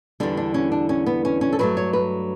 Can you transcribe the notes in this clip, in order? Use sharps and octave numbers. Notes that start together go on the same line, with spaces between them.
E2 D3 G3 D4
D4
C#4
D4
C#4
B3
C#4
C#4
A4
G2 F#3 A3 B4
C#5
B4